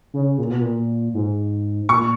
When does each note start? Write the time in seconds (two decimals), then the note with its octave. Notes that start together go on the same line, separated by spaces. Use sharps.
0.14 C#3
0.38 A#2
0.50 B2
0.61 A#2
1.14 G#2
1.89 A#2 C#6